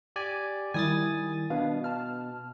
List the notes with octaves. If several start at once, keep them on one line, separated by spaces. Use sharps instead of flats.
G4 D5 G#5
D#3 G3 E4 G#5 D#6 A6
B2 D4 B4 F5
A5 F6